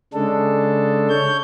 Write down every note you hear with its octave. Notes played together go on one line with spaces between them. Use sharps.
C#3 G#3 D4 A4
C#5 G6